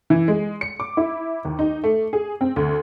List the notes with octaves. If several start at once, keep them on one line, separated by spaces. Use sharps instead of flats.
E3
G#3
C#7
D6
E4
D#2
D#4
A3
G#4
C4
D2